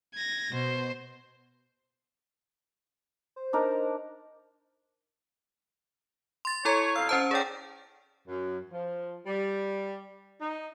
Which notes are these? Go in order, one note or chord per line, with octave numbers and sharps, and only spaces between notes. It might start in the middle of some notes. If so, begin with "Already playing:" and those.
G#6 A#6
B2 C5
C5
D4 D#4 A#4
C6 A6
E4 A4 C#5 A#5
F2 B2 F5 E6
C#4 C5 A5
C#4 D#4 G#4 D5 G5
F#2
F3
G3
D#4